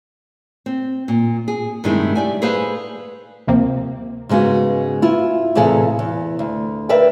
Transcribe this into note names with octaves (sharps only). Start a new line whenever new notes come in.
C4
A#2
G#4
G2 C3 D#3 G#3 A3 E4
G4 D5 G#5
G#4 A4 B4 C5 F5
D2 C3 F3 A#3 C4
G#2 C#3 G#3 B3 F#4
E4 F4
E2 A2 C3 G#4 A4 F5
E2
D2
A#4 B4 D5 E5 G5